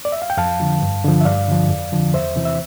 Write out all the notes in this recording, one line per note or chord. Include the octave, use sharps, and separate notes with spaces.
D5
E5
F5
G5
F2 F5 A5
D3 F3
G2
D3 F3
E5
G2 D5 F5
D3 F3
F2
D3 F3
E2 C5 E5
C3 E3
E5